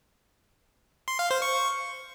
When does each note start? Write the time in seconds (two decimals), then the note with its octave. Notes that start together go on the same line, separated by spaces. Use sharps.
1.08 C6
1.19 F5
1.31 C5
1.42 C#6